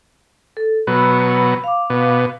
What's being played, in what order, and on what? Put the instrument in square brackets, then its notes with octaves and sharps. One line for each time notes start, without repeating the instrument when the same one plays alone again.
[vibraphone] A4
[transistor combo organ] B2 F#3 [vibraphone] B5 E6
[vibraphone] F5 D6
[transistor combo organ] B2